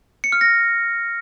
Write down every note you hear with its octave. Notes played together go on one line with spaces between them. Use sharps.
C#7
F6
A#6